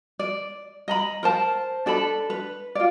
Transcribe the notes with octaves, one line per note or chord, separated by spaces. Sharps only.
D5
D#5 A#5 B5
A#4 C5 A5
D4 A4 A5 B5
B4
F4 D5